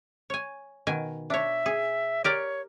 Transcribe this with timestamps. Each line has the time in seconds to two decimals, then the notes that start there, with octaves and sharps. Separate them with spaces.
0.30 C#5 G#5
0.87 B2 D#3 G#5
1.30 D4 C#5 E5
1.66 G#4
2.24 G4 A#4 C#5 D5